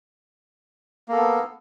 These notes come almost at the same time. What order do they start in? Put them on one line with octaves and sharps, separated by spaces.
A#3 A4 B3